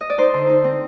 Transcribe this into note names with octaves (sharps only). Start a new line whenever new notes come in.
D#5
D5
D#4 C5
D3
D#4
C4